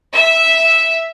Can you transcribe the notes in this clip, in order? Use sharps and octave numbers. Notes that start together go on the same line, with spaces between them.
E5